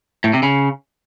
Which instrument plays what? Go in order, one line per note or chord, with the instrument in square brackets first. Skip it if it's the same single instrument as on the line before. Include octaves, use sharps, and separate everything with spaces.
[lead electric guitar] A2
C3
C#3